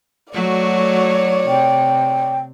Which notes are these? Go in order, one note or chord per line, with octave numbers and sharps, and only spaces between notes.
F#3 A3 F#4 C#5 D5
C3 G5